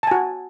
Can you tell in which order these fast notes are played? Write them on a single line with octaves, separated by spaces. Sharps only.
A5 G#5 F#4